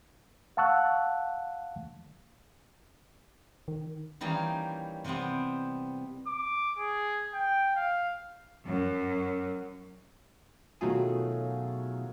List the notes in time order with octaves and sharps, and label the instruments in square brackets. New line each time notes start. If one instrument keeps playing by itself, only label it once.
[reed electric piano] F5 F#5 A5 C#6 E6 F#6
[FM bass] D#3
[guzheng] D#3 E3 G3 A#3 C#4
C3 E3 G3 B3 C4
[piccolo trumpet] D6
G#4
G5
F5
[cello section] F#2
[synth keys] B2 D#3 F#3 A3 F4 G#4